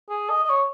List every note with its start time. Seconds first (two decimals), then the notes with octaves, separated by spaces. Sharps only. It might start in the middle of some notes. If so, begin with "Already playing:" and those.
0.10 G#4
0.30 D#5
0.44 D#5
0.50 C#5